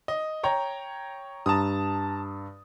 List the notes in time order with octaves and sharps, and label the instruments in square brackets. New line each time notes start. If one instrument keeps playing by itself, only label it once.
[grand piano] D#5
C#5 G5 A#5
[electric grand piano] G2 [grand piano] A5 A#5 D#6